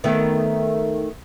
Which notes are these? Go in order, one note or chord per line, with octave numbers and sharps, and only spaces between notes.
D#3 A3 B3